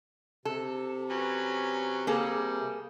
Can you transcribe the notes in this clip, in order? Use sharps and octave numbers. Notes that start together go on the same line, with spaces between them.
C3 A4
F#3 C#4 B4
G3 A#3 G#4 A4